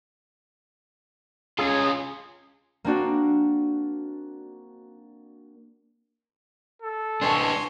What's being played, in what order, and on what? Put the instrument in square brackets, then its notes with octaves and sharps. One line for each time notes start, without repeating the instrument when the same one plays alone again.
[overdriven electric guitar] C#4 F4 [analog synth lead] G#4
[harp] A#3 C4 D4 F#4
[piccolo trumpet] A4
[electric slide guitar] D4 B4 D#5 [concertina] G#5 C6 [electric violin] A5 C#6